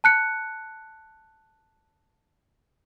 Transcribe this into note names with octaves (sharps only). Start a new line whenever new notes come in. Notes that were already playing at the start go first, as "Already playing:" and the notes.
A5 F#6 C#7